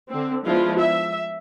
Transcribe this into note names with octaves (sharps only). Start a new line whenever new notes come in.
D3 C4
F3 G#3 B3 D4 E4 F4
E5